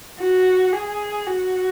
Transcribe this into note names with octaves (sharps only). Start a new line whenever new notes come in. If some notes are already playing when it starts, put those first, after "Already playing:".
F#4
G#4
F#4